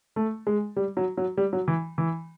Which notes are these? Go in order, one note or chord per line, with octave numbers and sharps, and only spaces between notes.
A3
G#3
G3
F#3
F#3
G3
F#3
E3
E3